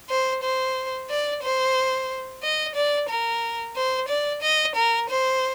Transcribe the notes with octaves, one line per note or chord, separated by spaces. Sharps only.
C5
C5
D5
C5
D#5
D5
A#4
C5
D5
D#5
A#4
C5